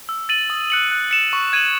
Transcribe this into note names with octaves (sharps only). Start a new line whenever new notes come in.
E6
A6 D#7 F#7
D#6
F#6 C#7 F#7
F#6
C#7 E7
C#6
G#6 D#7 F#7